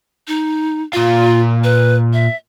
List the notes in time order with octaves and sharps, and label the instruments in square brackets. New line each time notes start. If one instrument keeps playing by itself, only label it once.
[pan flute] D#4
[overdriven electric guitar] A#2 F5 [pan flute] F4
[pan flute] B4
E5